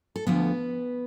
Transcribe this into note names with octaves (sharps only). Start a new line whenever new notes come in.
A4
D2 D3 F3 B3 B4